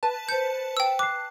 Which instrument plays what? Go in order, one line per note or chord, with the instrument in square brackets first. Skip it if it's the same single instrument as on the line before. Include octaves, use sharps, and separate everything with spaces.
[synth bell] B4 A5
[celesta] C5 C#7 [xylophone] G6
[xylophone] G5 E6
[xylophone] D6 [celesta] F#6 C7